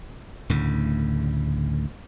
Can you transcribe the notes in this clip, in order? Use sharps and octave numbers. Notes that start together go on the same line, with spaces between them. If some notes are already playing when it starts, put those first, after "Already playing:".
D2 A2 C#3